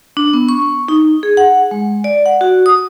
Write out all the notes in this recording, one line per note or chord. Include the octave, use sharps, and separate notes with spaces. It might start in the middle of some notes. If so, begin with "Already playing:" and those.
D4
B3
C#6
D#4
G#4
F#5
G#3
D5
F#5
F#4
D#6